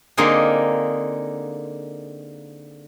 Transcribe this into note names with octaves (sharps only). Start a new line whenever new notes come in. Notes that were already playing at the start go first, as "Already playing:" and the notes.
D3 A#3 C4 D#4 F4 G#4